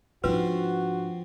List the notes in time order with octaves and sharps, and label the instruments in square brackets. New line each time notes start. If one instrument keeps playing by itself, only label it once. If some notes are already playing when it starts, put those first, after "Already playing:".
[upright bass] G#2 D4 [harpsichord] F3 C4 F4 [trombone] F#4 [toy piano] B4